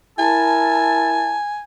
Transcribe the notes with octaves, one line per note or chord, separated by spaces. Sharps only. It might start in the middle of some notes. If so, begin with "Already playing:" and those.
E4 A#4 G#5 A5